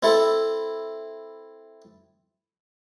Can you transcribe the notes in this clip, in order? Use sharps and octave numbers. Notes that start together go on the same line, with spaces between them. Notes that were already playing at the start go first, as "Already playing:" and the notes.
C4 E4 A4